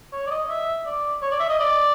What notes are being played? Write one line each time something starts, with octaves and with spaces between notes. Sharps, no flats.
C#5
D5
D#5
E5
D5
C#5
D5
E5
D#5
D5